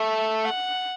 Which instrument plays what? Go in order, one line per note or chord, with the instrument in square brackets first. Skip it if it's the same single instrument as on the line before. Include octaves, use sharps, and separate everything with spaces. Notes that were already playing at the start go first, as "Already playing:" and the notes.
Already playing: [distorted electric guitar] A3 [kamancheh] E5
[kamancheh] F#5